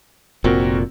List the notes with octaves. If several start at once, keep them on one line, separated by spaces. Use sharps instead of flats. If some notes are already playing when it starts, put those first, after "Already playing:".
F1 A#2 C4 F#4 A#4